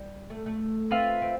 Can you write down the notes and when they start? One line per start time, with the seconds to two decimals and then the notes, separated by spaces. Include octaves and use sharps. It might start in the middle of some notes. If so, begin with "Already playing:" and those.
Already playing: G3
0.30 A3
0.46 A3
0.91 C4 F4 B4 E5
1.22 C4